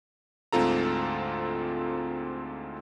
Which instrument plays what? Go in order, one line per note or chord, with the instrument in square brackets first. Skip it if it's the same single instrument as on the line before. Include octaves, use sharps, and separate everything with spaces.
[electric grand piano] D2 G#2 C4 F4 A4 A#5